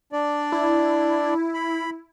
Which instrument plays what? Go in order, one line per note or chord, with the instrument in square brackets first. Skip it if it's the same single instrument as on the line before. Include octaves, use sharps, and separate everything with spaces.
[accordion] D4 D5
[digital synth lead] E4
[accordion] B5